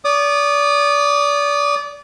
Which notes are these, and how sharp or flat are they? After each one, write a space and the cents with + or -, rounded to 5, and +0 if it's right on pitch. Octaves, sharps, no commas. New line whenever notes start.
D5 -30 D#6 -35